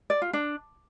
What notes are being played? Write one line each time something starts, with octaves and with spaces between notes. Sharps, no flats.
D5
F4
D4